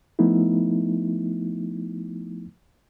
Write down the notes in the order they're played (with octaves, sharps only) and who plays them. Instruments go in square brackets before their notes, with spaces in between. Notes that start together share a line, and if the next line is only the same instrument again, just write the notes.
[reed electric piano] F3 A3 B3 D#4 E4